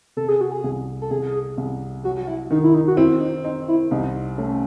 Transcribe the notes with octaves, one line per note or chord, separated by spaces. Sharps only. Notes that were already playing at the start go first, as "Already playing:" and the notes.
C3 A4
G#4
F#4
G#4
C2
A4
C2 G#4
C2
F#3 F#4
F#4
E4
D#3 D#4
E4
D#4
F#4
C4 E4
D#4
C4 D#4
E4
C2 D#4
A3 C#4